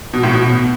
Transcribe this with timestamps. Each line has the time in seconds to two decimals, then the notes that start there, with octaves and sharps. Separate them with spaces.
0.13 B2
0.23 A2
0.33 B2